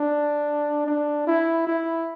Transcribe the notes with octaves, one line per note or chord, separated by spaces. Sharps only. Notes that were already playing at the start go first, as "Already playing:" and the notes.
Already playing: D4
D4
E4
E4